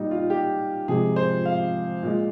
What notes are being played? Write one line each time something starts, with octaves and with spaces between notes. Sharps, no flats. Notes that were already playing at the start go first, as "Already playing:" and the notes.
Already playing: A#2 G3 D#4
F4
G4
C3 F3 G#3 G#4
C5
F5
A#2 G#3